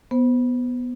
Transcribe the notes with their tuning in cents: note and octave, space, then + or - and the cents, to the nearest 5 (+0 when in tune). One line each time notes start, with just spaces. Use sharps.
B3 +0 C5 +0